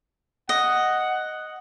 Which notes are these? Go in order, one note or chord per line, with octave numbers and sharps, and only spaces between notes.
D#5 F#5